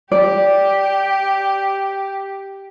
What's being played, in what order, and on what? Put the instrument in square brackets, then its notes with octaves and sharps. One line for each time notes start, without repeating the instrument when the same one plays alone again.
[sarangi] G4 [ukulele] D5